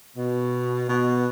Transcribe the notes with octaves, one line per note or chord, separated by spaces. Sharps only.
B2
B2